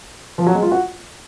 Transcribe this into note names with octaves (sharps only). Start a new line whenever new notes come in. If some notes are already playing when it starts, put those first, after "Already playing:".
F3
F#3
G#3
F4
F#4